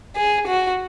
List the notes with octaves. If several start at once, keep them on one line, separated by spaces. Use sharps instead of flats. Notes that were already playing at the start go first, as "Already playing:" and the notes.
G#4
F#4